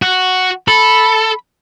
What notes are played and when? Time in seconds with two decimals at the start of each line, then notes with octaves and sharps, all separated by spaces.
0.02 F#4
0.68 A4 B5